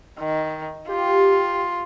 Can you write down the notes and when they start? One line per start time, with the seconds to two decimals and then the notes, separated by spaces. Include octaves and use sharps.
0.19 D#3
0.89 F4 G4